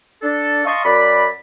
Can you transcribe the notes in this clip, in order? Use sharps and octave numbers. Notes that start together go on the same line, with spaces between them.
D4 A4
D#5 F5 A5 C6 C#6
F#2 D5 B5